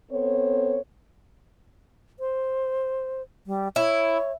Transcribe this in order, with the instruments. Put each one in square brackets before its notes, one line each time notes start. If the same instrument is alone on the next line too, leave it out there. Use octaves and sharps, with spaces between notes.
[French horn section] B3 C4 A4 C5 C#5
[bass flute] C5
G3
[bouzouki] E4 [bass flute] C#5